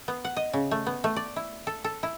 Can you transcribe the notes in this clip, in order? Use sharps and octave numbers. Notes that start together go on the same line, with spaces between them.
B3
F#5
D#5
C#3
A3
B3
A3
D5
E4
A4
A4
E4